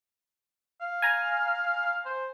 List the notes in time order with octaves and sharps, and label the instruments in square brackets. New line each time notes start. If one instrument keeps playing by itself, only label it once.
[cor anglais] F5
[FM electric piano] G#5 A#5
[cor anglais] C5